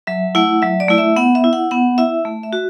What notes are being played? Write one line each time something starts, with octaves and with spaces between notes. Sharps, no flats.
F#3 E5
A3 E4 F#5
F#3 E5
D5
A3 E4
E5
B3 F#5
E5
E4
F#5
B3 F#5
E4 E5
A3
E5
F#4